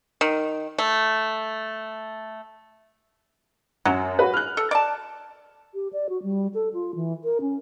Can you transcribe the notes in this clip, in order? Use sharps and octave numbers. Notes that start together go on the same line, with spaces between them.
D#3
A3
F#2 F#3
F#4 B4
F6 F#6
A4
D5 A5
G4
D5
F#4
G3
A4
F4
E3
A#4
C#4